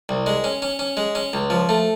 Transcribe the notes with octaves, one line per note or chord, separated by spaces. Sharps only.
C2
G#3
C#4
C#4
C#4
G#3
C#4
C#2
F3
A3